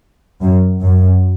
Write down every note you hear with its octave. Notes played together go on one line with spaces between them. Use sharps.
F#2
F#2